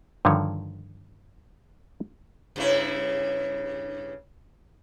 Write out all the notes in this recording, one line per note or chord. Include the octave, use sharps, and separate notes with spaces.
G2 D3 D#3 F3 C#5
G2 C#3 E4